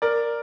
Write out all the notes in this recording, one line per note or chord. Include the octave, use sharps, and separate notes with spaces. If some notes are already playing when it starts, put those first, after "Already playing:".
A#4 D5